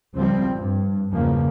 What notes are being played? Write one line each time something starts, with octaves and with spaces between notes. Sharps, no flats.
C#2 F3 G3 C4
G2
E2 C#3 F3 A#3